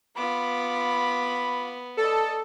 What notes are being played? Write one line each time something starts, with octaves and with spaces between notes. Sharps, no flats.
B3 F4 B5 D6
A4 D5 D#5